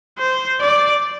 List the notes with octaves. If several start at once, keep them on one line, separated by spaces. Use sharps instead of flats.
C5
D5